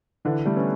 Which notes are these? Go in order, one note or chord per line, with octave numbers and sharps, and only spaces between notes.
D3 E3
G3 A3
B3 C#4